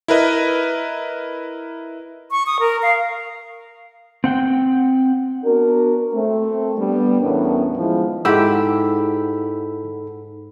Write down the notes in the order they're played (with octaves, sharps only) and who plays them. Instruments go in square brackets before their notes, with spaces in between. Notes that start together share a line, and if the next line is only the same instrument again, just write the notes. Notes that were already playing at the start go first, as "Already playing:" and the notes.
[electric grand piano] E4 A#4 B4 D#5
[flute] C#6
D#6
A#4
F5
[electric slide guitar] C4 F#5 G5
[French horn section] B3 D4 F#4 A#4
A3 C4
G3 B3 D4
E2 A2 B3 C#4 D4 A#4
D#3 F3 G#3 B3 E4
[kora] G#2 G4 [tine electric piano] D#4 A4 B5 [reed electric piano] E4 F#5 E6